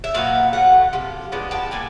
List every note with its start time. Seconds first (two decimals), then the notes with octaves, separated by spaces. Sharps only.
0.04 E5
0.14 A#2 F#3 B3 F5
0.53 B2 F#3 A3 F#5
0.93 C3 F3
1.32 F3 G#3 B3 D4
1.51 G5 A5
1.71 A#2 G3 G#5